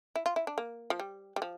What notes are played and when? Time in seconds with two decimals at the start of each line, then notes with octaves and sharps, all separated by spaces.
0.15 E4
0.26 F4
0.36 E4
0.47 D4
0.58 A#3
0.90 F3
0.99 G3
1.36 G3
1.42 F3